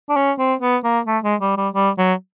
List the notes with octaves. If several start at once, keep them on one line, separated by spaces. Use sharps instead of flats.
D4
C#4
C4
B3
A#3
A3
G#3
G3
G3
G3
F#3